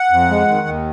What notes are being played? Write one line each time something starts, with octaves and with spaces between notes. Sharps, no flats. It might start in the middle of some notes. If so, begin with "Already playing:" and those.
Already playing: F#5
F2
G#3
D#3
D#2